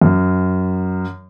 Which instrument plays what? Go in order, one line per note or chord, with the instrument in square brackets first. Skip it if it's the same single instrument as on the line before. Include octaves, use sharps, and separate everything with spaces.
[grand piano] F#2